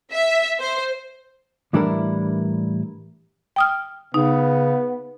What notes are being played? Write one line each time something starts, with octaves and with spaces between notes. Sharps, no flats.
E5
C5
A2 E3 G3 D4 E4 A#4
G5 D#6 F6
C#3 B3 D#4